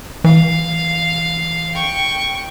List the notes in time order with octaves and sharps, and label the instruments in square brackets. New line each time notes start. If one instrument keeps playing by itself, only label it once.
[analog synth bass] E3 [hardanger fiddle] F5
[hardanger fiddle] G5 C#6